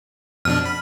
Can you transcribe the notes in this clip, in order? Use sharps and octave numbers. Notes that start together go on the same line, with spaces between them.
F2 B2 D4 F6
B5